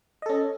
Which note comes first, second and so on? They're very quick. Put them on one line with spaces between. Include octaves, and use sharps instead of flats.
D#5 A4 C#4